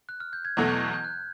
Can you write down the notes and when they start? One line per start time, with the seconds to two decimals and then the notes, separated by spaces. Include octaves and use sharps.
0.09 F#6
0.20 F6
0.33 G6
0.45 G#6
0.57 E2 B2 F#3 A3 G#6
0.68 G6
0.80 G6
0.93 G6
1.04 F#6